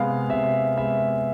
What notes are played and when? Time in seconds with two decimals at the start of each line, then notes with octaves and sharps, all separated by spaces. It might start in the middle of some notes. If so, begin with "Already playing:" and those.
Already playing: C3 G#3 B3 F5
0.30 C3 E5
0.77 G#3 B3 E5